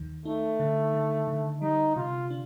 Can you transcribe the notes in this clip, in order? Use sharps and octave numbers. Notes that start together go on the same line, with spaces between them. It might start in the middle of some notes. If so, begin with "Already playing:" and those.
Already playing: D#2 D#3
A3 D#4
D3
D3
D3
G3 D#4
C3 F4
D4